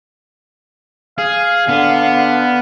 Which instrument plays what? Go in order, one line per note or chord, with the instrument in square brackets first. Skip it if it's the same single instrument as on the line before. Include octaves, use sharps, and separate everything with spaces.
[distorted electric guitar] G#4 [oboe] F5
[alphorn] D3 [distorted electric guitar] B3